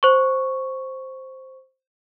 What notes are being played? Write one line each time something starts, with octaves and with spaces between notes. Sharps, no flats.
C5 C#6